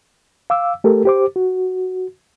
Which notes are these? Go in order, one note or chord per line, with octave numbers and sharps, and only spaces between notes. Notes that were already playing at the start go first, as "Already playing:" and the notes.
F5 D6 E6
A3 G4 A4 A#4
G4 C5 D6
F#4